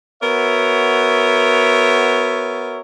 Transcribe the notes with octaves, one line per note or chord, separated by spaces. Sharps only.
B3 F#4 A#4 C#5 E5